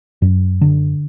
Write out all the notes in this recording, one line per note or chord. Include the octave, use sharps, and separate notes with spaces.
F#2
D3